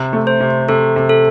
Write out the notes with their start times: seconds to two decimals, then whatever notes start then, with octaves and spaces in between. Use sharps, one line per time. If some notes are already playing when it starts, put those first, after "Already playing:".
Already playing: C3
0.13 A3
0.27 C5
0.41 C3
0.69 C3 A4
0.96 C3
1.09 A4